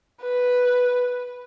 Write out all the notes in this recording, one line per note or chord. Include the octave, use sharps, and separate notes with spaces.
B4